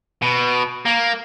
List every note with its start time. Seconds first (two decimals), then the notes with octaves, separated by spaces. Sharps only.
0.22 B2
0.86 A#3